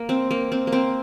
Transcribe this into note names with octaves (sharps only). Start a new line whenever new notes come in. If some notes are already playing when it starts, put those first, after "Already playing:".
Already playing: A#3
C4
A#3
C4
A#3
C4